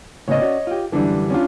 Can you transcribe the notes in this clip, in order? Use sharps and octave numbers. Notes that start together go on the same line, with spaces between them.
A2 C#3 B3 C#5 D#5
C#4 F#4 D5
F4 G4
F#2 D3 E3 G3 D4
C#4 D4 F4